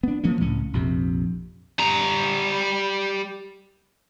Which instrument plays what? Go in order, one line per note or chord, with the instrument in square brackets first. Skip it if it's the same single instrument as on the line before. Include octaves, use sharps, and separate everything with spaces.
[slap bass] B3 D4
F3 A#3 C#4
C#2 A2 C#4
A#1 F2 C3
[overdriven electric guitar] G3 A#5